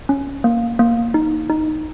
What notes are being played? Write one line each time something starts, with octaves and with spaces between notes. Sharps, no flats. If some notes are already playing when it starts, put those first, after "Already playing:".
C#4
A#3
A#3
D#4
D#4